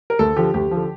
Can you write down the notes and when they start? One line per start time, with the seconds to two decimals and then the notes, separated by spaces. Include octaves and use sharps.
0.10 A#4
0.19 D2 A4
0.36 D3 F3 G4
0.54 D2 G4
0.71 D3 F3